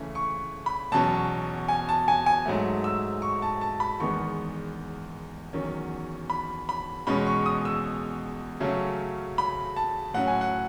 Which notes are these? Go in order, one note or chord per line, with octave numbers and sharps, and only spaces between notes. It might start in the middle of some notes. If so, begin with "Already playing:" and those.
Already playing: C#3 E3 A3 C#4
C#6
B5
E2 B2 F#3 C#4 A5
G#5
A5
G#5
G#5
G#2 F#3 A3
E6
C#6
A5
A5
B5
E2 D#3 G#3 B3 C#6
E2 D#3 F#3 C#4
B5
B5
E2 B2 G#3 C#4 B5
C#6
D#6
E6
C#3 F#3 A3 C#4
B5
A5
A2 F#3 C#4 F#5
G#5
F#5